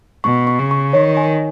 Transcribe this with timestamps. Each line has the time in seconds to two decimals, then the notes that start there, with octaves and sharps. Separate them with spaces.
0.24 B2 C#6
0.47 C#6
0.59 C#3
0.71 C#6
0.93 D#3 C#5
1.17 G#5